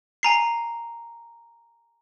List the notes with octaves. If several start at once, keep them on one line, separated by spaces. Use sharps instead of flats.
G#5 A#5 C7